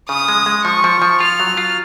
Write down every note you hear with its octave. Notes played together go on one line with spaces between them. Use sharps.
C#3 D#6
G#3
G#3
F3 C#6
F3
F3
F4 F6
F#3
F4